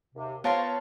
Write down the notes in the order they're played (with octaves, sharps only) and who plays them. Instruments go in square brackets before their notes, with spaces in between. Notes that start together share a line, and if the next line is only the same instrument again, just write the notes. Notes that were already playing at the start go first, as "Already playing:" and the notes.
[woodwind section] D#2 C3
[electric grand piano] B3 C#5 A5 [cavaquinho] F4 A#4 C6 [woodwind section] C5 F5